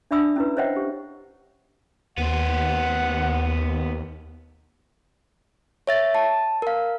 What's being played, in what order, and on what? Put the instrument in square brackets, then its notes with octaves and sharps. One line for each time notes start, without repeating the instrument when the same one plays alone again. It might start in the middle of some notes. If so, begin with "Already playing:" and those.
[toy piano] D4 D5 E5 B5 D#6 E6
C#4 E4 B4
C5 C#5 D#5 E5 F#5 G5
G4
[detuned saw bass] D#2 [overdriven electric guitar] B3 C5 [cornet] F#5
[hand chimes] C#5 E5 A6
A5
A#4 F5